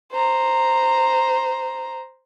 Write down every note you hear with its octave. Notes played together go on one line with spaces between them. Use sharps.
C5 A#5